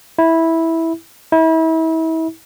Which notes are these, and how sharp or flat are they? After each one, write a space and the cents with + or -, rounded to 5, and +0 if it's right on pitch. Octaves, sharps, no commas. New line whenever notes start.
E4 -10
E4 -35